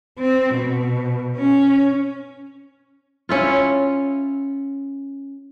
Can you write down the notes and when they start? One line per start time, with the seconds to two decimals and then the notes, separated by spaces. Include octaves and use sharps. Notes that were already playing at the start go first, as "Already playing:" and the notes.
0.19 C4
0.54 B2
1.37 C#4
3.29 C#4 E4 F4